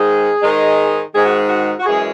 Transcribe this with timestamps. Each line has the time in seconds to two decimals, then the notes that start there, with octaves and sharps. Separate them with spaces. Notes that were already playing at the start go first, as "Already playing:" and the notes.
Already playing: G#2 D#3 G#3 D#4 G#4
0.42 G#2 D#3 G#3 D#4
1.14 G#2 D#3 G#3 D#4 G#4
1.26 F#4
1.49 F#4
1.79 F#4
1.86 F#2 E3 G#3 C#4 G#4